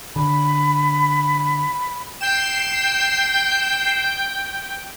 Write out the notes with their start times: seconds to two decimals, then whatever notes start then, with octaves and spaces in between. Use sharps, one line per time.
0.16 D3 B5
2.21 G5 C7 E7